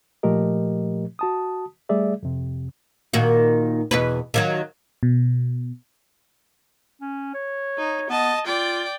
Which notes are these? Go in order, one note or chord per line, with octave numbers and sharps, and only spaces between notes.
A#2 F3 A3 G4 A#4 D#5
F#4 A5 D#6
G3 A3 G#4 D5 E5
F2 C3
A#2 D#3 F#4
E2 B2 B4
D#3 F3 F#3
B2
C#4
C#5
D#4
B3 D#5 A5
F4 D5 G5